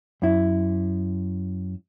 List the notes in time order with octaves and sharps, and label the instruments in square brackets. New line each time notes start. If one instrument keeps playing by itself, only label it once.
[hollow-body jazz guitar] F#2 E4